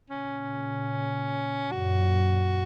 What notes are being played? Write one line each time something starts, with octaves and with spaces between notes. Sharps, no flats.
A#2 C#3 C#4
F#2 A#2 F#4